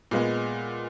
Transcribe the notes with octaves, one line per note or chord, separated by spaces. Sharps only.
A#2 G#3 B3